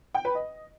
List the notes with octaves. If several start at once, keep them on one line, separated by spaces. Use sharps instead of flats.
G5
B4
D#5